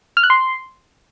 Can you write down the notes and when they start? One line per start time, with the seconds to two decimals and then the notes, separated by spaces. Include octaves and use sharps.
0.17 F6
0.23 F#6
0.30 C6